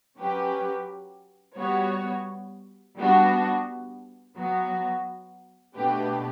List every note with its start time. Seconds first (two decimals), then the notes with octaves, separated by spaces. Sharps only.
0.17 F#3 C#4 G4 B4
1.57 G3 B3 F#4 C#5
2.97 G3 B3 D4 F#4
4.37 F#3 B3 F#4
5.76 B2 A3 D4 G4 B4